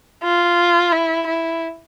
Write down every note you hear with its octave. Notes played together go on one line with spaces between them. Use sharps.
F4
E4
E4